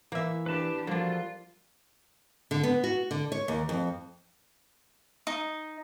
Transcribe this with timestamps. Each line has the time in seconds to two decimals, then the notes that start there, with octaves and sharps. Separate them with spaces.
0.12 E3 A#3 E5
0.46 D4 G4 B4 A5
0.87 F3 G3 A#3 D4 F4 F#4 A4 C5
2.51 D3
2.63 B3
2.84 F#4
3.11 D3
3.32 C#5
3.48 D#2
3.69 F2
5.27 D#4